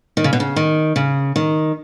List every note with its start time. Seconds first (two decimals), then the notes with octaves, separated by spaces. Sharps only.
0.17 D#3
0.24 C#3
0.33 B2
0.40 C#3
0.56 D#3
0.96 C#3
1.36 D#3